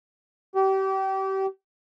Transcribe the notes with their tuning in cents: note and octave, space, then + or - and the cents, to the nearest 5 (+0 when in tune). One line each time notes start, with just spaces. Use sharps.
G4 -30